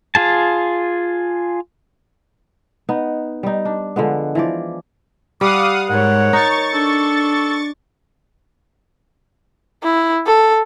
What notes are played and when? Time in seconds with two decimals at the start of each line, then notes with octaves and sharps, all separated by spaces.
0.15 F4 G#4 A5
2.89 B3 D#4
3.43 G3 D#4
3.65 D4
3.96 D3 F3 G#3 B3
4.35 E3 F3 D5
5.41 G3 F5 F#5 D6 D#6
5.89 G#2 A#4 C#5 F#5
6.33 D#4 C#6 A6
6.74 D4 A4
9.83 E4
10.27 A4